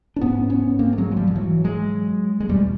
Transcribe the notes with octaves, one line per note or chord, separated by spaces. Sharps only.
D4
G#2 B3 C#4
B3 C#4
A#3 C4
A3
F#3 G#3
G#3
F3 G3
F3
E3 F#3
F#3 G#3
G#3
E2 B2 G3 A3